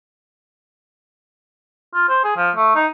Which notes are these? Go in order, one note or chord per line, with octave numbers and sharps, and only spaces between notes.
F4
C5
G#4
F3
A3
D#4